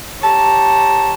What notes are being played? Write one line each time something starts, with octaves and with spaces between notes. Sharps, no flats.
G4 C#5 A5 A#5